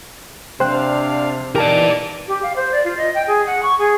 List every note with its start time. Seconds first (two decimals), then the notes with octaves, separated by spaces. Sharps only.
0.60 C3 D4 C5 F5 G5 F#6
1.56 E3 D#4 G4 A#4 D5 A5 D6
2.27 G4
2.42 F5
2.55 C5
2.72 D5
2.84 F4
2.97 D#5
3.14 G5
3.27 G#4
3.46 F#5
3.62 C#6
3.78 G#4